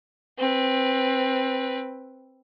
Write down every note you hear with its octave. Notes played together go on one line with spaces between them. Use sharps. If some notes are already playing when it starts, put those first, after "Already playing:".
C4 B4